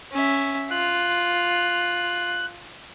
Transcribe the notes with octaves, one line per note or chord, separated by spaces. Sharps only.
C#4 E5
F4 F#6